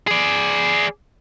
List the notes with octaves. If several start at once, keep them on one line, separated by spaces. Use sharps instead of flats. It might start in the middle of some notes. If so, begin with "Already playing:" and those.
G#4 D5